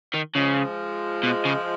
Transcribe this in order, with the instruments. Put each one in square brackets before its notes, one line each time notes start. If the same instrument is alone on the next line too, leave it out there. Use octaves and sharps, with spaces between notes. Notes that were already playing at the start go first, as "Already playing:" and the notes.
[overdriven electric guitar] D#3
[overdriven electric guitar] C#3 [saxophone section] F3 G#3
[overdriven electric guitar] B2
C#3